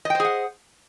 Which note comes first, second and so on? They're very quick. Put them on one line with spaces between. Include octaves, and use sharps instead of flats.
D#5 G5 C5 G#4 F#5